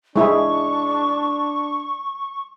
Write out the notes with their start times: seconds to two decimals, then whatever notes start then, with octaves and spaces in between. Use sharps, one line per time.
0.16 G#3 D4 E4 G#4 C#6